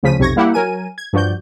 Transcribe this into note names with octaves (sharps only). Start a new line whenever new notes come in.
D2 C#3 F3 B6 D#7
B1 F2 C3 C#6 G#6 A#6
G3 A#3 E4 G4 F#5
F#3 A#4 G#5 D#7
G#6
G2 F3 F#4 D5 G6